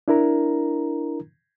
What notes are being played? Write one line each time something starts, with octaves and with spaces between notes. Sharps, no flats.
D4 E4 A#4 A#5